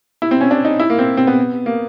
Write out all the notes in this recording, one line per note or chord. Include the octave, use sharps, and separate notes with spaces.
E4
C4
C#4
D4
D#4
E4
A#3
C4
C4
B3
A#3